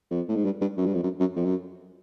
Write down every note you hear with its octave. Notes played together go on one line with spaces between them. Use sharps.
F2
A2
G#2
G2
G2
F#2
G2
F2
F#2
F#2
F2
F#2